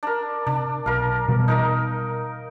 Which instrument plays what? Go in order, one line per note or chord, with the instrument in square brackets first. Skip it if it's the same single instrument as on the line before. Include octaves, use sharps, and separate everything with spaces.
[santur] D4 A#4
[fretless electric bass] C3 [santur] D4
[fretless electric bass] B1 [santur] A#4 F5
[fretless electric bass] B2 E3 G3
[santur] D#4 A#4 D#5